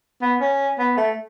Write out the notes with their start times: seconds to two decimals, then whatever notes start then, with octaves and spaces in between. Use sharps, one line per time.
0.22 B3
0.41 C#4
0.79 B3
0.97 A3